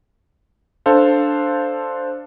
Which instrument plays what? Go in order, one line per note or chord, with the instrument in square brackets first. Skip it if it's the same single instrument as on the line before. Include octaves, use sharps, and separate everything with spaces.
[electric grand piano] D4 A4 C5 F5